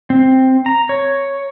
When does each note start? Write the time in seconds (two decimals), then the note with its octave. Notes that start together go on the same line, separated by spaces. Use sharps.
0.10 C4
0.66 A#5
0.89 C#5